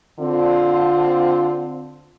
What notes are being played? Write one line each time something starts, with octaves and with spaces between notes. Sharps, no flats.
D3 C4 F4